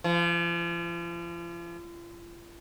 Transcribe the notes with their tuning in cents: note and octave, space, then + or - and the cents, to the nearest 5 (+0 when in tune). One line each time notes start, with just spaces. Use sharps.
F3 -40